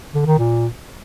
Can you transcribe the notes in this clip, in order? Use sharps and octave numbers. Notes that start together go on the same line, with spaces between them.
D3
D#3
A#2